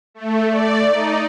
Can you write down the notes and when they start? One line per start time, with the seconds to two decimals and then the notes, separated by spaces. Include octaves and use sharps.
0.14 A3
0.48 D5
0.89 D#4